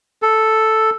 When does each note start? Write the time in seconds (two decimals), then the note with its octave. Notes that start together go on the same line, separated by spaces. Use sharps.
0.22 A4